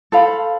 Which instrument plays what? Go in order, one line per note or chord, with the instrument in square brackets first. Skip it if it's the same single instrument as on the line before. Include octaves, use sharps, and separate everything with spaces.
[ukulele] A4 C5 F5 B5